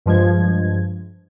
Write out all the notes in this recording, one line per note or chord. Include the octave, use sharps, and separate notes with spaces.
G2 F3 G#3 G#6